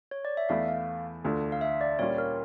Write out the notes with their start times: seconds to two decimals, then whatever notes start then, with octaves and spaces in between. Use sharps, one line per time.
0.11 C#5
0.25 D5
0.37 E5
0.49 E2 E3 A3 E4 F5
0.68 F5
1.24 D2 D3 A3 D4 F4
1.52 F5
1.61 E5
1.81 D5
1.99 A#2 G3 C#4 F4 C#5
2.18 A#4